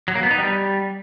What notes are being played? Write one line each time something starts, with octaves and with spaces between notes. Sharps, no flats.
F#3
A#3
B3
D#4
G3